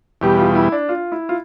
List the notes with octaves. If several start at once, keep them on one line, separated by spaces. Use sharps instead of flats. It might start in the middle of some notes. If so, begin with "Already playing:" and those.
E2 B2 G3 G4
F4
E4
D4
F4
E4
F4